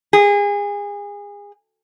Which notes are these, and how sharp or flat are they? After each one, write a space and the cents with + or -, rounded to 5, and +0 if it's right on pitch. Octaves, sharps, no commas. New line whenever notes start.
G#4 -30